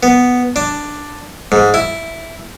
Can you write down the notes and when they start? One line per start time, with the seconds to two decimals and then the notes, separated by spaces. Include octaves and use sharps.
0.03 B3
0.56 D4
1.52 G#2
1.74 E4